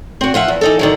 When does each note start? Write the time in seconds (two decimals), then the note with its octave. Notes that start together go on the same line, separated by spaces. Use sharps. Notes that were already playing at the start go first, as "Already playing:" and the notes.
0.21 C4 F#4
0.34 F3 F4 E5 F#5
0.48 E2
0.61 E3 D#4 A4
0.79 D3 D#3 F#3